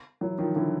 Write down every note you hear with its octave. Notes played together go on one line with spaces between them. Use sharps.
E3 F#3
D#3 F3
D3 E3